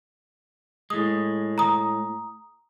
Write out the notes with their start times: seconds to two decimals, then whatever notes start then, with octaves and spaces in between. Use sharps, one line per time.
0.90 A2 G#3 D#6
1.58 A#5 D#6